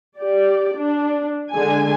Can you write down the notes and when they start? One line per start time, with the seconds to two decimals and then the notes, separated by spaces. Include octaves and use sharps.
0.18 G4 D5
0.78 D4
1.53 D3 G#3 G#5